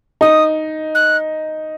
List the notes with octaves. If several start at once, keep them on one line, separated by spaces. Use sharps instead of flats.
D#4 D#6
F#6